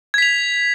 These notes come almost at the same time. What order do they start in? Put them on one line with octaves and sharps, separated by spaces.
G#6 B6 F7